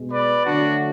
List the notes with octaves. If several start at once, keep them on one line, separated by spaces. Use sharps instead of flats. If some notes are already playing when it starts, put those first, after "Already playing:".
Already playing: B2 G#3
B4 D5
D3 F#3 A3 D4 F#4